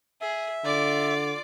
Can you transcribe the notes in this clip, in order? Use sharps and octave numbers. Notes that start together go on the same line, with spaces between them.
G#4 E5
D3 F4 D5 D6